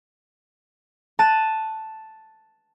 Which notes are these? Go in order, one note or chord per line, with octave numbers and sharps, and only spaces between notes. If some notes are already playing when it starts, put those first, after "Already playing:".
A5 F#6 D#7